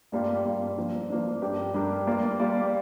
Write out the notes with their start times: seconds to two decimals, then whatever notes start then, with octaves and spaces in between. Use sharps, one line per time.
0.12 G2 G3 A#3 F4
0.45 G2 G3 A#3 F4
0.77 F3 A#3 D4
1.09 F3 A#3 D4
1.42 G2 G3 D4 G4 A#4
1.74 G2 G3 D4 G4 A#4
2.07 G3 A#3 F4 D5
2.39 G3 A#3 F4 D5